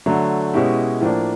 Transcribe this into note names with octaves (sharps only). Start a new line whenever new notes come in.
D3 F#3 A3
B2 G#3 C#4 E4 G4
A2 F3 A#3 D4